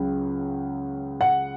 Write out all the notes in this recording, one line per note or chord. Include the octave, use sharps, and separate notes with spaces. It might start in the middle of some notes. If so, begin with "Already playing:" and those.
Already playing: C#2 C#3 F#3
F#5